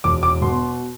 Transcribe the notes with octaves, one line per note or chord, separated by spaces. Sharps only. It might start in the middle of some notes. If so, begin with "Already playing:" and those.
E1 D6
D6
B2 C6